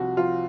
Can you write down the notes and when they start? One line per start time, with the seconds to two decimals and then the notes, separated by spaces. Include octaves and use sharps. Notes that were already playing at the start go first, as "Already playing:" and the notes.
Already playing: C2 F3 F#4
0.17 F3 F4